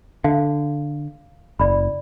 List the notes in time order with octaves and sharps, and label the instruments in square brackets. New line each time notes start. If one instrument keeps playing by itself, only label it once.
[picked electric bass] D3 [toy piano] F5
[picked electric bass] F#1 [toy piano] D5 B5